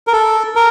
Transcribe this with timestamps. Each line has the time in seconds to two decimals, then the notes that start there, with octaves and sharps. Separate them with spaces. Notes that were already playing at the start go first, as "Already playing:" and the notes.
0.07 A#4
0.13 A4
0.56 A#4